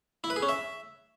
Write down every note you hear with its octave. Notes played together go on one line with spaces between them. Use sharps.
E4
B4
G#4
C#4
E5